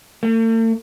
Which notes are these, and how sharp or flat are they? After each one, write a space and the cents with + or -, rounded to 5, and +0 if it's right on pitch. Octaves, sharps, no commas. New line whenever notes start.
A3 +45